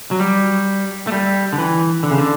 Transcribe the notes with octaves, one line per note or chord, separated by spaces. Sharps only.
F#3
G3
A3
G3
D3
E3
D3
C#3
D3